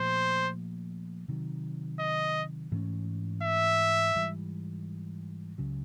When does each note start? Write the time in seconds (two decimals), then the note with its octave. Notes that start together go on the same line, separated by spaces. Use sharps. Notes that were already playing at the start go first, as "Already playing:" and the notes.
Already playing: A#2 F3 A3 C5
1.28 C3 D#3 F#3
2.00 D#5
2.72 G#2 E3 A3 C#4
3.44 E5
4.15 G#2 E3 G3
5.58 C#2 C#3 F#3